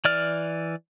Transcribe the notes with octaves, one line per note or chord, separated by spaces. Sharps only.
E3 D5 F6